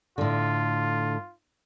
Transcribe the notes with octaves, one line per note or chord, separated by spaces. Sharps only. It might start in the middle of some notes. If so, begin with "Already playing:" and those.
A2 D3 F4